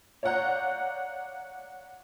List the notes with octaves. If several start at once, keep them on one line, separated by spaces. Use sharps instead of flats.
C#5 D5 F5 F#5 A#5 G6